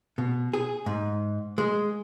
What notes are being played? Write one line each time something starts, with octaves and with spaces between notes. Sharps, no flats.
B2
G#4
G#2
G#3